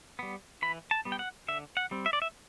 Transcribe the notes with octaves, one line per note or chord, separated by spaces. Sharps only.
G3 B3
E3 B5
A5
G3 B3
G5
F#5
D3 E5
F#5
G3 C4
E5
D5
E5